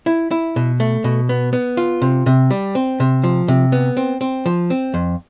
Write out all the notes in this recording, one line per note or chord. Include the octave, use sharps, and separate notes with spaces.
E4
E4
B2
A3
B2
B3
B3
F4
C3
C3
G3
C4
C3
F3
C3
B3
C4
C4
F3
C4
F2